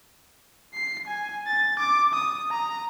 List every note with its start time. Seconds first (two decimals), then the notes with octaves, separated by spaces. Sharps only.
0.74 C7
1.07 G#5
1.47 A6
1.79 D6
2.14 D#6
2.51 A#5